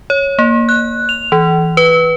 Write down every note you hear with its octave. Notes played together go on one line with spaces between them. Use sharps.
C#5
A#3
F#6
F7
E3
B4